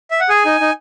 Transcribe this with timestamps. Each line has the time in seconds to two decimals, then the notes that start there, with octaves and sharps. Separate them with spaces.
0.11 E5
0.20 F#5
0.29 G#4 G#5
0.45 D#4
0.60 D#4